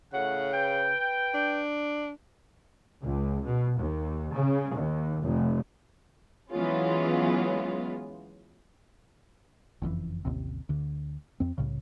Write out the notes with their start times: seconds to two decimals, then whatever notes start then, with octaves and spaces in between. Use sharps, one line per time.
0.13 A2 C#3 F#5
0.53 B4 G5
1.35 D4
3.02 C#2
3.45 B2
3.78 D#2
4.33 C#3
4.75 D#2
5.23 F1
6.52 E3 F#3 G#3 B3 C#4 F4
9.82 F#1 F2 A#2 E3
10.25 A1 D#2 C3
10.69 D2 D3
11.40 F2 C4
11.58 C2 A2 C#3